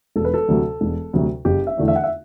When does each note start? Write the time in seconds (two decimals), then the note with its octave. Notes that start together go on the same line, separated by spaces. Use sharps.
0.16 E1 A4
0.25 B4
0.34 A4
0.48 D2 C3 F#3
0.81 E1
1.13 D2 C3 F#3
1.45 F#1 G4
1.67 E5
1.77 E2 D3 A3 E4
1.88 E5
1.96 F#5
2.03 E5